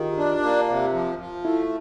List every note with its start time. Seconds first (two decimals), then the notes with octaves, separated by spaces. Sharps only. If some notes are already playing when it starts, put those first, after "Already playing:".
Already playing: D#3 F4 G4 G#4
0.17 D4
0.43 A#3
0.68 C3
0.93 F3
1.19 F3
1.44 A3 E4